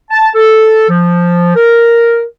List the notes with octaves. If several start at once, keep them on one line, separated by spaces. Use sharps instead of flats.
A5
A4
F3
A#4